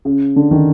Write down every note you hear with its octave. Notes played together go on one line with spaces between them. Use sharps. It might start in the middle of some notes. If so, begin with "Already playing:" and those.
C#3
D3
D#3